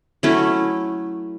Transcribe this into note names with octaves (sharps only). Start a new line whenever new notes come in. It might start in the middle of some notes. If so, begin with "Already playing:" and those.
F#3 A3 C#4 E4